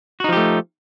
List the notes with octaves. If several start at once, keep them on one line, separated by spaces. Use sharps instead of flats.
F3 A3 D#4 F#4 G4